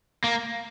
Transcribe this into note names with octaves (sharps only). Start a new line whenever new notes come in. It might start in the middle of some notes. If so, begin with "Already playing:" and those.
A#3